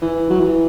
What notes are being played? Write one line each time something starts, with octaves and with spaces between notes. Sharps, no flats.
E3
F#3
E3